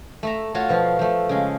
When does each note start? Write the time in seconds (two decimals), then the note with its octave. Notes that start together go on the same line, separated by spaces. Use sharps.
0.23 A3 E5 A#5
0.54 A3 F4 F#4 C#5
0.69 B2 F3 F4
0.99 F3 A3
1.29 C#3 G#3